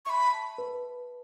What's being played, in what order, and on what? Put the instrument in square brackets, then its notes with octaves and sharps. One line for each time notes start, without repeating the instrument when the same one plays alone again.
[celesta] E5 [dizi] B5 C#6
[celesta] A5
B4